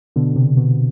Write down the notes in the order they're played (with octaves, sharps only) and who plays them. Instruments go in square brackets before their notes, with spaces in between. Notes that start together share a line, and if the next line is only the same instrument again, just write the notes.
[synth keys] B2 D3
C3
B2